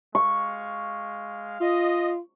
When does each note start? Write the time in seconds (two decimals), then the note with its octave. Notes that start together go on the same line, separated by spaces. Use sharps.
0.15 G#3 F5 C#6
1.61 F4 D#5